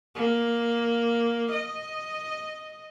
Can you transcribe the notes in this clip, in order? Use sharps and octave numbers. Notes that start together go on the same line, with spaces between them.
A#3
D#5